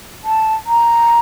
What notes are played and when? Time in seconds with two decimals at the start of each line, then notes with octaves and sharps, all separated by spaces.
0.24 A5
0.67 A#5